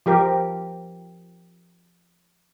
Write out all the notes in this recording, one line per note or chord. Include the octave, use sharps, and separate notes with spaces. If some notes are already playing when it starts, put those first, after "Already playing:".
F3 G4 A#4